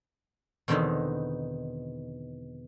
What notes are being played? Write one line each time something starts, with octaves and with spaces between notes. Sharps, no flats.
E2 B2 D3 D#3 C4 D#4